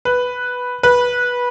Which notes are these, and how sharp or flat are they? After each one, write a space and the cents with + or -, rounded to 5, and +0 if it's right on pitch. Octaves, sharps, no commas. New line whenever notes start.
B4 +0
B4 -15